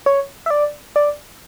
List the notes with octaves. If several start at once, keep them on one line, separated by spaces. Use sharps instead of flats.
C#5
E5
D5
D5